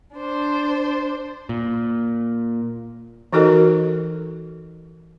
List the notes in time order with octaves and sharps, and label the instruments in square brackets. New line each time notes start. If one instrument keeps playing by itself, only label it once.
[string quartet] D4 C5
[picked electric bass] A#2
[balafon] E3 D#4 F#4 A4 A#4 D#5